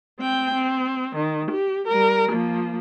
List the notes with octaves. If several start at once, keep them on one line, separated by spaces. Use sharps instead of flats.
C4 G5
C4
D#3
G4
G3 A#4
F3 A#3